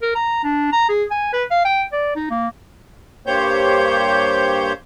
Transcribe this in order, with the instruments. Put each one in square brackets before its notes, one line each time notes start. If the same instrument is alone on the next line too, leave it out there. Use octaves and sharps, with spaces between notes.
[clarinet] A#4
A#5
D4
A#5
G#4
G#5
B4
F5
G5
D5
D#4
A#3
[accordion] G2 A#3 G4 C5 C#5 G6